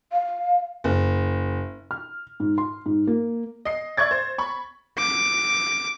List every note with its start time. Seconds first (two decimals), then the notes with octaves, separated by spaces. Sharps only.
0.12 F5
0.84 F#1
1.91 F6
2.40 G#2
2.58 C6
2.86 G#2
3.07 A#3
3.65 D#5 C7
3.97 D5 E5 C#6 G#6 A6
4.11 C5
4.38 B5 C#6
4.99 D6